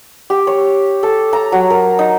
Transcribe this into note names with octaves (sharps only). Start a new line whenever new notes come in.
G4
C#5
A4
A#5
F#3
A#4
D#4